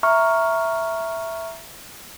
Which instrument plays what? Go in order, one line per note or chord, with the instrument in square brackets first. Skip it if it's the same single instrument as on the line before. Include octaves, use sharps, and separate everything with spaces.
[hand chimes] E5 A#5 C#6 F6